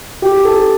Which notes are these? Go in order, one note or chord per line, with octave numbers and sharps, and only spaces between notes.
G4
A4